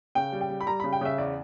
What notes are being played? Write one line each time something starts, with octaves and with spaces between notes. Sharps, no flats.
C#3 G5
G3
G5
G3
B5
G3 A#5
C#3 B5
G5
C#3 E5
E2 D5